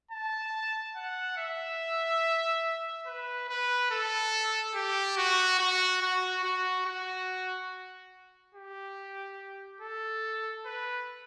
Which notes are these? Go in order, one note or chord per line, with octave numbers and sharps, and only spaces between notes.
A5
F#5
E5
B4
B4
A4
G4
F#4
F#4
F#4
F#4
F#4
G4
A4
B4